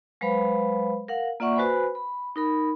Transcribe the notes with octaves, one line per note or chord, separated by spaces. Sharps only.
F#3 G#3 B4 C5 F5 B5
A#4 F5 F#5
A#3 F4 D5 E5 F#5 C#6
F#4 B4 C5 G#5 B5
B5
D#4 A#4 B5